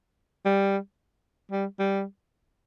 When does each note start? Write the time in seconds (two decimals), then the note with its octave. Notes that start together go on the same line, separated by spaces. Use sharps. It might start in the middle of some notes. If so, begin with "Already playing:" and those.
0.46 G3
1.51 G3
1.79 G3